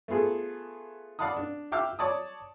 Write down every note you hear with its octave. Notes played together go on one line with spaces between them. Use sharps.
A3 B3 F4 G#4 A4
D5 F5 F#5 A5 B5 D#6
D4
E5 F5 G5 D6 E6 F6
C#5 D5 A5 D#6